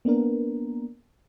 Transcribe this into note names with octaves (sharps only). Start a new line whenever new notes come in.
A#3 B3 D4 A#4